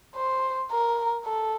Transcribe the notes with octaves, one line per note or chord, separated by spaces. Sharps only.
C5
A#4
A4